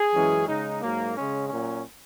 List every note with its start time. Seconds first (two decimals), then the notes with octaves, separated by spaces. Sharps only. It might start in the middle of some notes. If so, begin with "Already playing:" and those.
Already playing: G#4
0.14 F#2 E3 G#3 C#4
0.47 C#3 G#3 D#4
0.81 G#2 F#3 A#3
1.15 C#3 G#3 C#4
1.48 A#2 F#3 C#4